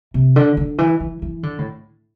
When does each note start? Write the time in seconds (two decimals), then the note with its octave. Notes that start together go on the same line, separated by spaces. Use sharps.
0.14 C3
0.36 D3
0.57 D3
0.78 E3
1.00 E3
1.22 E3
1.43 D3
1.59 A2